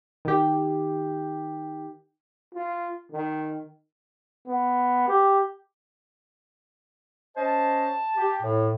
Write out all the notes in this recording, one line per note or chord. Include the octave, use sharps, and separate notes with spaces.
D#3 G4
F4
D#3
B3
G4
C#4 C5 D#5 A5
G4
A2